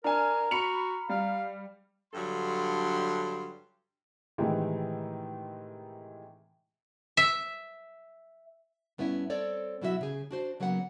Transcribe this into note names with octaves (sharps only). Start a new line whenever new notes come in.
D4 A#4 G#5 A#5 F6
F#4 B5 C#7 F7
G3 F5
G2 D3 F#3 A4 C6
A2 C3 D#3 E3 G#3
E5
G2 B3 C#4 E4
C4 A4 C#5 D5
B2 F#3 E4 F#4 C5 E5
C#3 G#4
D4 F#4 C5
C#3 F#3 A#3 B3 F#5